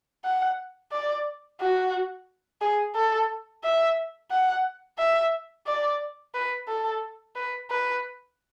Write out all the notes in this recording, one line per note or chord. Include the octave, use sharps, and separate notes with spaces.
F#5
D5
F#4
G#4
A4
E5
F#5
E5
D5
B4
A4
B4
B4